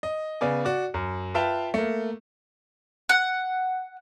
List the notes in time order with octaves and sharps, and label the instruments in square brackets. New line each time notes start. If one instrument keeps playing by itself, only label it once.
[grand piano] D#5
C#3 B3 D5 G#5
F#4 D5
F#2
F4 B4 E5 F5 G5 A5
A3 A#3
[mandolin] F#5